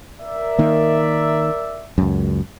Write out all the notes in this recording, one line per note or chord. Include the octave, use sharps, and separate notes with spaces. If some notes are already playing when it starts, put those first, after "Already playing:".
A#4 D5 E5
D#3 A#3
C#2 F#2